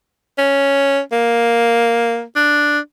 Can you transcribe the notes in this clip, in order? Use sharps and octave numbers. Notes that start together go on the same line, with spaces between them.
C#4
A#3
D4